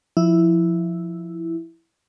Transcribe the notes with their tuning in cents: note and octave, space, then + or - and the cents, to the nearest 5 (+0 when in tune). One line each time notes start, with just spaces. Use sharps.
F3 +0 E4 +0